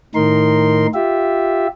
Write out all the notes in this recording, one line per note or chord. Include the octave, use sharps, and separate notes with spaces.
A2 D#3 D#4 A#4 C6
F4 G4 E5